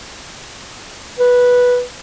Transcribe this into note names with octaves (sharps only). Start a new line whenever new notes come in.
B4